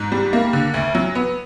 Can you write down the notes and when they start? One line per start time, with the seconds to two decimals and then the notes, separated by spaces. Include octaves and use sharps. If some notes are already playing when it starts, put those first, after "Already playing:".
Already playing: G#2
0.12 G3
0.33 A#3
0.53 D3
0.74 D2
0.95 F#3
1.15 B3